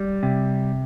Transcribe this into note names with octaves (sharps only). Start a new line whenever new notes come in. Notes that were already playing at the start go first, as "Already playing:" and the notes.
Already playing: G3
C3